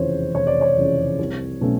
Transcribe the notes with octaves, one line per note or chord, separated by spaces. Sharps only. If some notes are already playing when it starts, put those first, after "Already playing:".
Already playing: F1 E2 C#3 F3 C5 C#5
F1 C#5
D5
C#5
E2 C#3 F3
C2
B2 F#3 A3 C#4